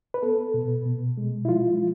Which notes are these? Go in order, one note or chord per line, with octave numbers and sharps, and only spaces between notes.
B4
B3 A4
B2
B2
G#3
E4
F3 F4